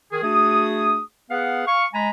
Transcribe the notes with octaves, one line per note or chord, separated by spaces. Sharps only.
D#3 G#4
A3 D4 F#4 G#4 D#6
B3 G#4 B4 F5 F#5
F5 C#6
G#3 G#5 A#5 B5